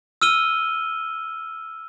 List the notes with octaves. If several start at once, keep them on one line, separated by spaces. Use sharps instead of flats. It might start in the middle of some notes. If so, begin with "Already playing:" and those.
E6 F6 D#7 G7